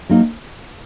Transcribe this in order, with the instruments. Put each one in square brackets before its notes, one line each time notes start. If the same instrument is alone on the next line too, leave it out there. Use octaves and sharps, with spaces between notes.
[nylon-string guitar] F#3 A#3 D#4